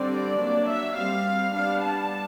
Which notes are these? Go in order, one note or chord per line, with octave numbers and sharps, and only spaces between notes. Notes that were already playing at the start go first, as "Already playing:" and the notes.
Already playing: D3 G3 C4 D5
F#3 A#3 D4
E5
G3 C4 F5
G3 B3 D4 F5
A5